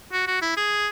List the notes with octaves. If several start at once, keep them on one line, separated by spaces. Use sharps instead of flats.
F#4
F#4
E4
G#4